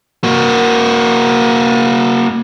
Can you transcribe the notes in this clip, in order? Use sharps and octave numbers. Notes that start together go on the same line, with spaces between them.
A#3 F#4